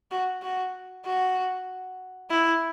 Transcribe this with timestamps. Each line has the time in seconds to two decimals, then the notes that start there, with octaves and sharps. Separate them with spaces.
0.11 F#4
0.42 F#4
1.05 F#4
2.30 E4